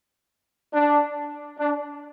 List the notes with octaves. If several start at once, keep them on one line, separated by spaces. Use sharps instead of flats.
D4
D4